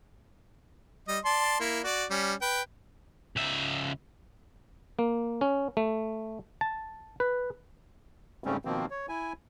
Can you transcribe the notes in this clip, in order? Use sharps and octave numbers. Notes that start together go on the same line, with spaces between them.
G3 D#5
D5 A5 C6
A#3 E4
F#4 D5
G3 C#4
B4 G5
C#2 E5
A#3
C#4
A3
A5
B4
G#2 C#3 G3 A3 C4 C#4
B2 D#3 F3 A#3 C4
C#5
E4 G#5